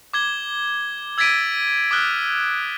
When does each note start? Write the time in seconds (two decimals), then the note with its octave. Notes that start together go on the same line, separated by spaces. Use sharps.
0.14 D6 G#6 G7
1.18 E6 G#6 A6 B6 D7 D#7
1.91 D6 D#6 F6 F#6